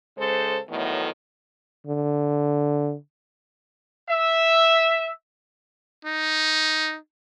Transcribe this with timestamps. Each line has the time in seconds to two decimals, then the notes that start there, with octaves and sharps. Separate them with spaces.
0.18 C#3 G#3 A4 C5
0.69 E2 A2 D#3 F#3 A3 B3
1.87 D3
4.09 E5
6.05 D#4